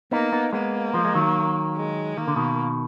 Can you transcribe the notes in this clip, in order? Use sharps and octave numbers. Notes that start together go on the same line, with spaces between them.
A#3 B3 D#4
B3 D#4
G#3 A#3 B3
F3 G#3
G#3
D#3 F#3
G#3
D#3 A#3
D3
B2 D#3